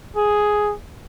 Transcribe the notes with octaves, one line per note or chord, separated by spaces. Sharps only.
G#4